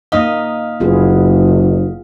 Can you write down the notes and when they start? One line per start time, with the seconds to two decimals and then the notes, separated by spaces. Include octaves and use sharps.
0.12 A#3 D#4 D#5 F5 D#6 F6
0.80 F#1 B3 F4 G#4